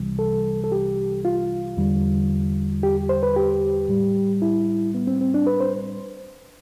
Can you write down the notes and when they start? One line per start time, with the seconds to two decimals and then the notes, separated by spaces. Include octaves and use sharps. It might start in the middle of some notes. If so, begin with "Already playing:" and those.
Already playing: C2 C3 E3 G3
0.19 A4
0.64 A4
0.72 G4
1.25 F4
1.77 E2 D3 G3
2.83 G4
3.09 C5
3.23 B4
3.36 G4
3.88 A2 G3
4.42 E4
4.94 B3
5.07 C4
5.21 C4
5.34 D4
5.47 B4
5.60 C5